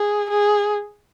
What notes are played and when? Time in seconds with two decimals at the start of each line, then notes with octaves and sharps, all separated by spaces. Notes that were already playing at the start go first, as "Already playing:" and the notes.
Already playing: G#4
0.30 G#4